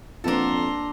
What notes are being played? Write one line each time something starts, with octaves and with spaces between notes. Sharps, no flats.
F2 A#3 B3 D4 F4 A4 A#5 C6